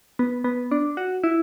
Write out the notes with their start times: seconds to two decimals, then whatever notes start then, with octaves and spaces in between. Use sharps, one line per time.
0.19 B3
0.44 B3
0.71 D4
0.97 F#4
1.24 E4